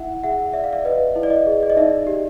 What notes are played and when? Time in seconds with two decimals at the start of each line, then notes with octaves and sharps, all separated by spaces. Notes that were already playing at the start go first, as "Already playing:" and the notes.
Already playing: E4 E5 F#5
0.23 G#4 E5 F#5
0.53 D5 E5
0.64 F5
0.72 D5 E5
0.85 B4 D#5
1.16 E4
1.23 D5
1.30 D#5
1.47 G#4
1.63 D5
1.70 D#5
1.77 D#4 D5 E5
2.07 G4